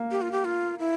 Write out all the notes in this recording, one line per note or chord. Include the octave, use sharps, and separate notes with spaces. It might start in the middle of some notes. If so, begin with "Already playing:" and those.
Already playing: A#3
G4
F4
G4
F4
E4